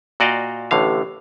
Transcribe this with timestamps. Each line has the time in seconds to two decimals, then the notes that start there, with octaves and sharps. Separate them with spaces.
0.20 A#2 F#4 D5 D#5 F5 G5
0.71 A1 A2 D3 F5